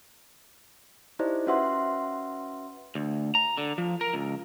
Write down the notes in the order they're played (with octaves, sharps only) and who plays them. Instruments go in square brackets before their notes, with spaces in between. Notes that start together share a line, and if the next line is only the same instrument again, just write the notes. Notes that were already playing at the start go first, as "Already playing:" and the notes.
[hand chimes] D#4 E4 G4 C5 D5 D#5
C#4 F#4 B4 E5 F#5 C6
[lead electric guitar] D2
A#5
D3
F3
A#4
C#2